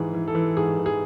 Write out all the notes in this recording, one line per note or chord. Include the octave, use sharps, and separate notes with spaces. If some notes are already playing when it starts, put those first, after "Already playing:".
Already playing: G#2 E3 G#4
E3
A4
E3
G#2 G#4
E3
G#4